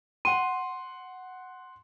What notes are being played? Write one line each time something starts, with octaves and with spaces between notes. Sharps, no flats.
F#5 C6 D#7